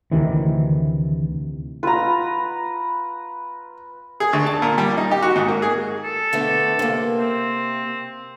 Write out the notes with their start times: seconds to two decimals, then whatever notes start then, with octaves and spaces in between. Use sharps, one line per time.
0.11 D2 C3 D#3 E3
1.83 F4 B4 A#5
4.20 G#4
4.33 D2
4.46 A5
4.62 A#2
4.78 G3
4.97 D#4
5.11 G4
5.22 F#4
5.36 G#2
5.48 A#3
5.62 G#4
6.04 A4
6.33 D3 A3 B3
6.79 C3 A#3
7.18 C4